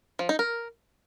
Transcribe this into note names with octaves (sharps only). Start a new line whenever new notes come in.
F3
D#4
A#4